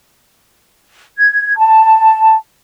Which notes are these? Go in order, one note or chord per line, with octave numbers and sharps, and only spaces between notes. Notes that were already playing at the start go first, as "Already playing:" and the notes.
G#6
A5